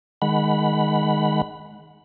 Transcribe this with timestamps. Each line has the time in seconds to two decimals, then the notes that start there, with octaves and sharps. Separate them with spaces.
0.22 D#3 G#3 F#5 B5